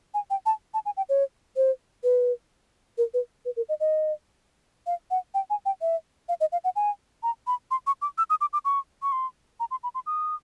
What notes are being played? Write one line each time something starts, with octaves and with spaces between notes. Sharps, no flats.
G#5
G5
A5
A5
G#5
G5
C#5
C5
B4
A#4
B4
B4
A#4
D#5
D#5
F5
F#5
G5
G#5
G5
E5
F5
D#5
F5
F#5
G#5
A#5
B5
C6
C#6
D6
E6
D#6
D6
D6
C#6
C#6
C6
A#5
C6
B5
C6
D#6